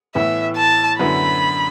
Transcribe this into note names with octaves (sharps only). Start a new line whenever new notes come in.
A2 E3 B3 E5
A5
F#2 D3 B3 E4 B5